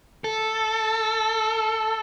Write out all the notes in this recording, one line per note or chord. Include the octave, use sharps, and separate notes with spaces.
A4